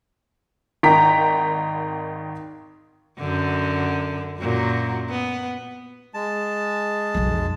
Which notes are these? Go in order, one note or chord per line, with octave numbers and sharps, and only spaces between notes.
G#1 D#3 G5 A#5 B6
F#2 D3
F#2 A#2 F#3
B3
G#3 A5
B1 F2